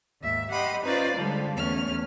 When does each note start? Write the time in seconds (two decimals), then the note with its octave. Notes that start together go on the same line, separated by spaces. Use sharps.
0.21 D#2 G#2 E5
0.50 G4 D#5 F#5 B5 C6
0.83 C#4 D#4 F4 B4 C5 D5
1.17 D3 F3 G3 G#3
1.56 E2 A3 C#4 F6